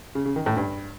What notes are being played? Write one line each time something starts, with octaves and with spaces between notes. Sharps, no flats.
C#3
C#3
D#3
A2
G2